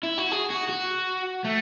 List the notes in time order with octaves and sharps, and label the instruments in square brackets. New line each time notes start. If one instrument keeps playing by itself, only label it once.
[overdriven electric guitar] E4
F#4
G#4
F#4
F#4
A3